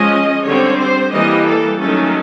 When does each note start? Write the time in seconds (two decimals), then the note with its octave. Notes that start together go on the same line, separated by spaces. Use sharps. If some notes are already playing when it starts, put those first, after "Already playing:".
Already playing: F3 G#3 C#4 D#5
0.45 D3 G3 C4 C#5
0.78 C5
1.12 E3 G3 A#3 D#5
1.45 A4
1.79 D#3 F#3 A3 C#4 A4